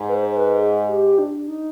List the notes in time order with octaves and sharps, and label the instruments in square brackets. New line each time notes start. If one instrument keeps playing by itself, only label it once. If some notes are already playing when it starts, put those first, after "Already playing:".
Already playing: [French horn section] G#2
[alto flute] B4
C5
C5
B4
G#4
G4
D4
D#4